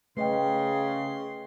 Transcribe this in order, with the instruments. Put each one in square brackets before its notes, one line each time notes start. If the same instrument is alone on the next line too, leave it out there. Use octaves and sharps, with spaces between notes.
[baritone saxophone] C#3 [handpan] A3 [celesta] B4 D#5 G5 [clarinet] C6
[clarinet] C6